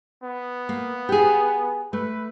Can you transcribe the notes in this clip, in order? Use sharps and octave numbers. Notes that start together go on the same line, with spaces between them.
B3
A#3
G4 G#4
A3 B4